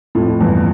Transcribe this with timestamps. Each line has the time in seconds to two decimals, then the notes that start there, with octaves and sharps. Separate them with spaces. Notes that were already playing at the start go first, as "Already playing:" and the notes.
0.15 F2 A2
0.29 F2
0.40 E2 G2